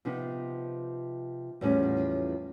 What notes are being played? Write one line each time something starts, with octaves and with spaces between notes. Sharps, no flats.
C3 F3 B3 D#4
E2 A2 F3 G3 B3 C#4